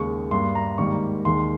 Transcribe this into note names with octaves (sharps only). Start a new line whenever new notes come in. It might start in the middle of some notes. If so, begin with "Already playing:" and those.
Already playing: D#2 C#3 G#3 C#6
G2 G3 A#3 C6
A#5
G#2 D#3 G3 A#3 C#6
D#2 D#3 G#3 C6